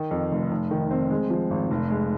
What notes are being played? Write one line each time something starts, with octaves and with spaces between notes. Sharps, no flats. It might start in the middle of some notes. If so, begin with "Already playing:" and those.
Already playing: D#3
F2
F1
F1
D#3
C4
G#3
F3
G#1
F1
G#3